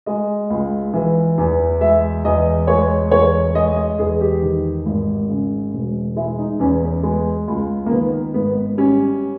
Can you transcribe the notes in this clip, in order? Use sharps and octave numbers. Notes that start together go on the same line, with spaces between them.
G#3 D#5
C#2
E3
E2
G#3 E5
E2 D#5
G#3 C#5
E2 C#5
G#3 D#5
D#5
E2 G#4
G4
D#3
G#1
C#3
E1
G#3 E4
D#4
E2 C#4
B3
G#3
C#2
A#3
D#3 B3
G#1 B3
G3 C#4